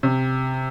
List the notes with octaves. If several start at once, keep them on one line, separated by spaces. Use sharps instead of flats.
C3